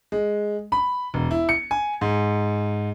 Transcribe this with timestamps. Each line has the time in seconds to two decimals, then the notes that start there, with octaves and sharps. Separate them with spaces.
0.12 G#3
0.72 B5
1.14 E1
1.31 E4
1.49 C#7
1.71 G#5
2.01 G#2